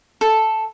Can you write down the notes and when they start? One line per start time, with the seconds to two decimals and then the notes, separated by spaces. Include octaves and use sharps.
0.21 A4